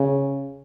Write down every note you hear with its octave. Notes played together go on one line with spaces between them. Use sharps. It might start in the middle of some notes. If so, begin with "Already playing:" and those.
Already playing: C#3